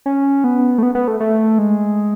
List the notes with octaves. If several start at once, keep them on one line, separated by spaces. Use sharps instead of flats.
C#4
B3
A3
B3
B3
A3
A3
G#3